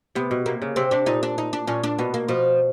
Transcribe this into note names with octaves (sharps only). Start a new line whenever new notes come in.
C3 B3
B2
C3 A#3
C#3
C3 C4
C3 D4
A#2 D#4
D4
D#4
D4
A#2 C#4
D4
B2 B3
A#3
B2 F3